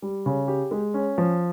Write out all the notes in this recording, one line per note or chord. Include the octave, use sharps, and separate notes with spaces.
G3
C#3
G4
G#3
C#4
F3